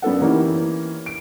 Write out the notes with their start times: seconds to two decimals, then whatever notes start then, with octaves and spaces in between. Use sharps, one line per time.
0.02 F#2 B3 D4 A4 F#5
0.21 E3 A#3 C#4 D#4 G4
1.06 D7